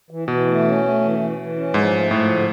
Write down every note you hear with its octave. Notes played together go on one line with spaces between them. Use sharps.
E3
B2 E3
A3
C#4
A3
E3
E3
E3
C#4
G#2 F3
A3
A2 F3
D3